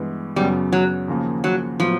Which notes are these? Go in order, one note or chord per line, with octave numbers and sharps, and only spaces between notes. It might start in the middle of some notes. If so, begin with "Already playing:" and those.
Already playing: G2 E3 G#3 B3
F#2 C#3 F#3 G3 B3
F#3
D#2 C#3 F3 A#3
F#3
A2 F3 F#3 B3